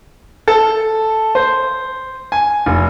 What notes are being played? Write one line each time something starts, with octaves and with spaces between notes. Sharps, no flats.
A4
C5
G#5
F1